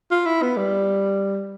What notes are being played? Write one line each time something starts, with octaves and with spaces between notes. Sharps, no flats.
F4
E4
B3
G3